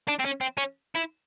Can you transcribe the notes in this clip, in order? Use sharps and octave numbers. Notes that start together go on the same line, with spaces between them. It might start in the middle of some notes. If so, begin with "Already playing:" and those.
D4
C4
C#4
C4
C#4
E4